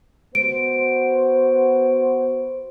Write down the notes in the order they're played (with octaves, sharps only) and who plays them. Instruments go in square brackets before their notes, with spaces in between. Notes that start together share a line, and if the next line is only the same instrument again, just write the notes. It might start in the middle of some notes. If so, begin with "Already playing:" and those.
[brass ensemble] B3 F#4 C5 [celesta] D7